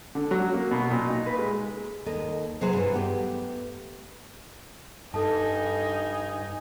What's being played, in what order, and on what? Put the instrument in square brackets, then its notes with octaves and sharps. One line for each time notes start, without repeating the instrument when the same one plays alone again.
[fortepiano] D3
F#3
A#3
B2
A#2
D#4
B4
G#3
[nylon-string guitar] D#2 A4 D#5
C3 F#3 G#4 B4 C5
G2 E3
A3 B3 G4
[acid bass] G2 [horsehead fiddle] D#4 G#5 [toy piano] A4 A5